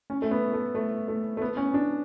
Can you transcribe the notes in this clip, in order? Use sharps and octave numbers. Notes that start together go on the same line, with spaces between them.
C#4
A3
B3
A3
A3
A3
A3
B3
C#4
D4